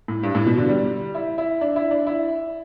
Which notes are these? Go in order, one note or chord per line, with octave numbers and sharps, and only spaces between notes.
A2
G2
A2
B2
D3
G3
E4
E4
D4
E4
D4
E4